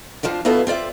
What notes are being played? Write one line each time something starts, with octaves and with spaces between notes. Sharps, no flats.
F3 C4 D4 F4
B2 B3 D4 E4 F4 A4
C4 F4 D5 E5